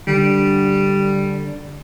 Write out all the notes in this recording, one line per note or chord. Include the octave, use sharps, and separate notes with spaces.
D3 G3